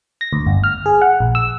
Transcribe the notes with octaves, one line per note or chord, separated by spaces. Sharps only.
A#6
D2
G1
F6
G#4
F#5
A#1
E6